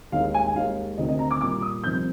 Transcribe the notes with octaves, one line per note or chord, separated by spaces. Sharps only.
D#2 D#3 G#3 F5
G#5
D#2 D#3 G#3 F5
D2 C3 D#3 D#5
D#5
A#5
D6
A#2 G3 A#3 D6
D#6
F2 C3 D#3 G3 G6